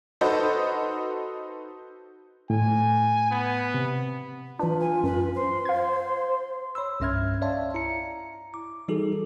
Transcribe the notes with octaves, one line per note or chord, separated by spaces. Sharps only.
D#4 F#4 A4 B4 C5 D#5
A2 G#5
B3
C3
E3 D4 F4 B4
G#5
F#2 B4
C5 C6
F5 G#6
C#5 B5 C6 E6
C2 G2 C#4 E5 F6 G#6
C#5 D5 E5 F5 A5 C6
E4 A#5 C#7
D6
E3 G3 D#4 F#4 G#4 A4